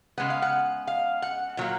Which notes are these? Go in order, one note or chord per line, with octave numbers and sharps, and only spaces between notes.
C#3 G#3 B3 F#5
F5
F#5
F5
F#5
A#2 F#3 A#3